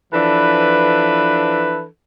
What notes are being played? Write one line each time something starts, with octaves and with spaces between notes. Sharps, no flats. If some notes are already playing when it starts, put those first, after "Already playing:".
E3 F3 D4 A4 B4